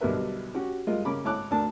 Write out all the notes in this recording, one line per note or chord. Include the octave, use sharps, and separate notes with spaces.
B1 D3 G3 A#4 B4 E5
C#4 F#4 G4
G3 G#3 F4 A#4 D#5
C#3 A#3 C#4 B5 D6
G#1 E4 C#5 A5 D6 F#6
D2 A#3 D4 A5